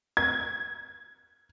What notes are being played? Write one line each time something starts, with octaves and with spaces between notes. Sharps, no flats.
G#6